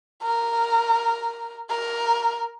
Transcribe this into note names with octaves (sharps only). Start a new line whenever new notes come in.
A#4
A#4